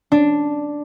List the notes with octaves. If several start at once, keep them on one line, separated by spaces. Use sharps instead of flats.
D4